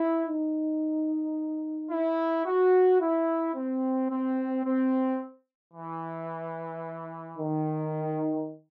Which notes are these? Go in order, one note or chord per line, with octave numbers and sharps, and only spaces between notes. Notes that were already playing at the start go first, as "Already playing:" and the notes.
Already playing: E4
D#4
E4
F#4
E4
C4
C4
C4
E3
D#3